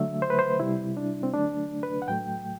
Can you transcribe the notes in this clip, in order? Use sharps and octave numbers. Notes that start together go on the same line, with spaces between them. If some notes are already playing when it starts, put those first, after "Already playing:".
Already playing: D3 F#3 A3 E5
C5
B4
C5
C3 G3 E4
D4
C4
D3 F#3 A3 D4
B4
F#5
A2 F#3 A3 G5